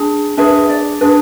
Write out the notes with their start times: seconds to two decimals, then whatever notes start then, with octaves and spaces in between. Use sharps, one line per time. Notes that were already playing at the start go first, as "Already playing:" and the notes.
Already playing: D4 G#4
0.37 D4 G#4 B4 E5
0.69 D5
1.01 D4 G#4 B4